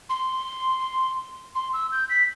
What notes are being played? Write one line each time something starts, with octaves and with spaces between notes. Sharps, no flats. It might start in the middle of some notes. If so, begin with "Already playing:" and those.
C6
C6
E6
G6
B6